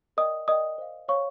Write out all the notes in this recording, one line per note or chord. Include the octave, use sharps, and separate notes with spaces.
A#4 D5 D#5 G5 D#6
A#4 D5 D#5 G5 D#6
C5 F5
C5 C#5 F5 C#6